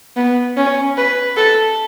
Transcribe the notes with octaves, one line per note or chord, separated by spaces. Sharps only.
B3
C#4
B4
A4